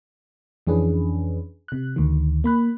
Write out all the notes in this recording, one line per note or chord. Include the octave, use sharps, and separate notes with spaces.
F2 E3 C#4 D4 G#4 B4
C3 F#6
D2 D#3
A#3 B5 F#6